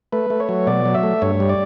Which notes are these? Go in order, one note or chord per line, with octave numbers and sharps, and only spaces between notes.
A3 B4
A3
C#5
F#3
B2 D5
F#3
E5
A3
G2 C#5
G3
D5